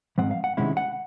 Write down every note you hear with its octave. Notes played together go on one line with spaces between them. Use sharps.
G#2 F3 G#3 C4 F#5
F5
F#5
C3 D#3 G#3 C#4 E4
F#5